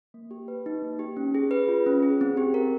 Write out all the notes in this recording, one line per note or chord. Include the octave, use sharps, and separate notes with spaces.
A#3
G4
B4
D#4
A#3
G4
C#4
G#4
B4
F4
C#4
G#4
C4
G4
A#4